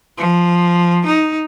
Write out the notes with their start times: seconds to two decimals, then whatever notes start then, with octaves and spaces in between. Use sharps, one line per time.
0.18 F3
1.06 D#4